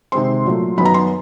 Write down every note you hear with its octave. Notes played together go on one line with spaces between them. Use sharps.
C3 D#3 G#3 C4 C6
A#2 F#3 A3
F#2 D#3 F#3 B3 B5
A#5
C6